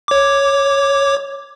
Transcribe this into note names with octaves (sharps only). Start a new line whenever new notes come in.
C#5 D6